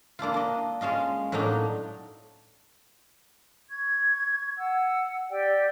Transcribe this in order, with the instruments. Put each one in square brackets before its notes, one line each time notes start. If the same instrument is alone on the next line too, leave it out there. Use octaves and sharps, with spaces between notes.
[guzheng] A#3 D4 E4 F4
D4 D#5
G#3 C#4 F4 D#5
A2 F#3 A#3 D4 D#4
[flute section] C#6 G#6
F#5 E6
G4 D5 G5 E6